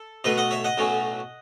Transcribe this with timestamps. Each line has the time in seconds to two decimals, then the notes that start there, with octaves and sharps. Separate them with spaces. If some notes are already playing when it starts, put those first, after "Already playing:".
Already playing: A4
0.24 B1 B2 A3 B4 D#5
0.37 D#5 F#5
0.51 C#5 E5
0.64 D#5 F#5
0.77 B1 A2 F#3 C#4